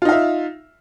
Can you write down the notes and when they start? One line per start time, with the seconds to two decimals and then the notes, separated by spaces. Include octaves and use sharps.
0.02 F4
0.05 D#4
0.09 F5
0.12 E5